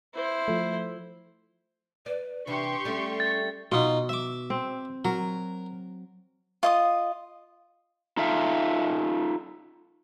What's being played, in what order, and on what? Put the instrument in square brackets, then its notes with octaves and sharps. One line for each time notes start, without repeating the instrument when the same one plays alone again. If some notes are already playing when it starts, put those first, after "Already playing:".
[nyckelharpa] E4 C5
[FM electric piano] F3 A3
[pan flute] B4 [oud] D5
[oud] C3 E3 [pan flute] D4 [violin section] G4 C6 C#6
[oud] G3 A3 [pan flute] C#4
[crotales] A6
[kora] B2 [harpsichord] D#4 F4
[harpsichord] E5 D6
[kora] C4
[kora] F#3 [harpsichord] A#4
[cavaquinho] F4 D#5 D#6
[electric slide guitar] D#4 F4 A4 E5 F5